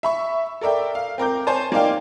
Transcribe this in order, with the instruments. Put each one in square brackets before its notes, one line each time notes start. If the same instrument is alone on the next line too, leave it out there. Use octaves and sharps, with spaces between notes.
[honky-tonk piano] E5 B5 C#6
A4 A#4 D5 E5 G5
F5
C4 A#4 D6 G6
C5 C#5 G#5 A5
A#3 D#4 D5 F5 G5